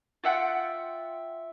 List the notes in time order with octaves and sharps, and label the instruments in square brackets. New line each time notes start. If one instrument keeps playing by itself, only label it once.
[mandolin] F4 E5 F#5 G5